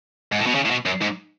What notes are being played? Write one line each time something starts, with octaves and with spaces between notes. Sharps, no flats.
G#2
A2
B2
C#3
A2
B2
F#2
G#2